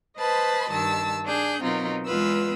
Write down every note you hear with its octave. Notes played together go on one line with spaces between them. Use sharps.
B4 C5 D#5 A5 B5
G2 D#3 A5 E6
D4 G#4 G6
B2 F#3 C4 D#4 F4 A#4
E2 G#3 B3 F4 B4 E6